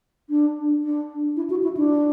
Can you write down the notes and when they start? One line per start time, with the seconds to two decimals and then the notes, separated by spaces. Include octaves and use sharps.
0.30 D4
0.84 D4
1.37 E4
1.50 F#4
1.63 E4
1.77 D4